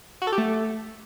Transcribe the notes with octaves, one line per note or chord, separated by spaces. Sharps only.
F#4
A4
G4
A3